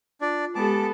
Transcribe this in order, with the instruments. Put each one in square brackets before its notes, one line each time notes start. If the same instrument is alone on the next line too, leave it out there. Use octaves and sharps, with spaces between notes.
[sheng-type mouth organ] D4 D5 [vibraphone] F4
[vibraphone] G#3 G4 [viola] B3 A4 [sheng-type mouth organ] A5 D6